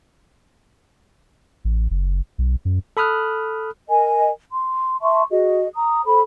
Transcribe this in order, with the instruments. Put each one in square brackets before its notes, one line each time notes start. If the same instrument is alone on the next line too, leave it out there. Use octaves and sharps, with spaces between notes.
[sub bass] A1
F#1
B1
F#2
[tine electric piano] A4 B5 D#6 F6 F#6
[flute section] A#4 D#5 G#5
C6
E5 A5 C6 C#6
F#4 G#4 D#5
A#5 D#6
A4 C5 B5